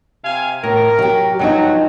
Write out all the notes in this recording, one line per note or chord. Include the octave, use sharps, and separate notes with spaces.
C3 F5 G#5
A2 A#4
F#3 G4
G2 F3 F#3 D#4